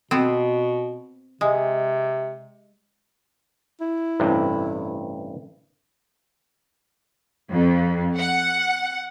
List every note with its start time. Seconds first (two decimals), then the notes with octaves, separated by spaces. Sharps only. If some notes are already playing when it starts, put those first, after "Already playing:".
0.11 B2 B3 C4
1.41 C3 G#3
3.81 E4
4.20 A1 G2 C3
7.50 F2
8.16 F#5